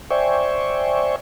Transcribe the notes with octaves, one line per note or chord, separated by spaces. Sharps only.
C5 D5 E5 G5 G#5 C#6